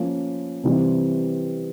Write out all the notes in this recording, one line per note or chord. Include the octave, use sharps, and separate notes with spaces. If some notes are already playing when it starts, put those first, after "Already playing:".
Already playing: F3 A#3 C#4 F4
C3 E3 G3 C4